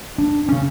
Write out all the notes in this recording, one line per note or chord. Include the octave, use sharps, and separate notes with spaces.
D4
C#3 C#4